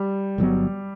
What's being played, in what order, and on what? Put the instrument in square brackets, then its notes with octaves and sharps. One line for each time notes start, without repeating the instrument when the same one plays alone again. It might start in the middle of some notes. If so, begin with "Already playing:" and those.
Already playing: [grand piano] G3
[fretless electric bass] G1 G2 F#3 B3